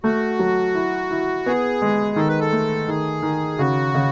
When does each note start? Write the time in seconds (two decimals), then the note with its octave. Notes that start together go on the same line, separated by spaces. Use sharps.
0.03 A3 F#4
0.39 F#3
0.75 E4
1.11 E4
1.46 B3 G#4
1.82 G#3
2.16 D#3 A4
2.28 B4
2.40 A4
2.52 A3
2.88 D#3 G#4
3.22 D#3
3.58 C#3 F#4
3.95 C#3